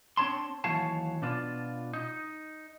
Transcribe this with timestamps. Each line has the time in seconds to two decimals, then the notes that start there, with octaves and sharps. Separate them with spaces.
0.17 C4 D4 C#5 A5 C6
0.64 D#2 E3 F#3 C#5 F5 A5
1.22 B2 D4 F4
1.93 D#4